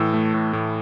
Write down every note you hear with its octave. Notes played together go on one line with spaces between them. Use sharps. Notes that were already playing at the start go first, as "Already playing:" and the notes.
Already playing: A2 E3 E6
A3
A2
A2